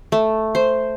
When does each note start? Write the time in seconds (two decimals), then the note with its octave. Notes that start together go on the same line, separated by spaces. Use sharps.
0.12 A3
0.55 C5